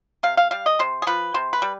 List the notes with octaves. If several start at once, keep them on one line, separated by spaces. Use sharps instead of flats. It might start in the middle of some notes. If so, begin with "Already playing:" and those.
C3 F5
F5
G3 F5
D#5
C3 C5
G#4
F3 B4
C3 C5
B4
G3